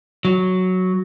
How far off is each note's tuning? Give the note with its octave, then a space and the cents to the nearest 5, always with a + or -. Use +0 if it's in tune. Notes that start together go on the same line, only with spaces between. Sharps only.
F#3 +0